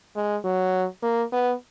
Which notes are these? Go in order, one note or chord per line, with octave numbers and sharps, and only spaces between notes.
G#3
F#3
A#3
B3